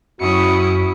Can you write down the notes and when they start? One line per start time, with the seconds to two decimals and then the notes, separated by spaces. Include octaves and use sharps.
0.21 F#2 C#4 E4 F#4 D#6 C#7